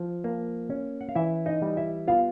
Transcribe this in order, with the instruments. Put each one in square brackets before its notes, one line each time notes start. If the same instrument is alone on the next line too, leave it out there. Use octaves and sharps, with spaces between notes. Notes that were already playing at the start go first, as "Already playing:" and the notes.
Already playing: [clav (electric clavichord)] F3
A#3
C#4
F#5
F5
E3 E4 E5
D#4 D#5
G3
E4 E5
B3 F4 F5